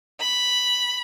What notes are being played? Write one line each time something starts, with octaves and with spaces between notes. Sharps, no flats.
B5